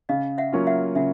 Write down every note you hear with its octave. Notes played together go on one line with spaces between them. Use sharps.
C#3 D#5 F5
E5 F#5
F#3 A#3 C#4 F4
E5 F#5
C#3 E5 F#5